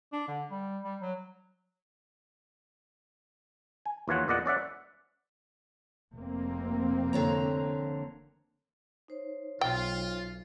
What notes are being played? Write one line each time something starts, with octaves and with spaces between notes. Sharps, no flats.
D4
D3
G3
G3
F#3
G#5
D#2 E3 F4 C#5 F#5
E2 A#2 D5 D#5 F#5
C#4 D5 E5 F#5
F1 A#3 C4
D3 C#5 A#5
D#4 C5 C#5
B1 F4 G5